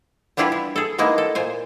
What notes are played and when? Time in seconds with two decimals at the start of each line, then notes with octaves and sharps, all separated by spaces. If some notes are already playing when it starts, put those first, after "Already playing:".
0.37 G3 B3 D4 E4 F4 G4
0.52 E4
0.76 G#4 A4
0.98 G#3 A#3 B3 D#4 E4
1.18 A4
1.35 A#2 C5 G#5